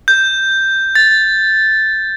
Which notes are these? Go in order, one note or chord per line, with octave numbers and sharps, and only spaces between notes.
G6
A6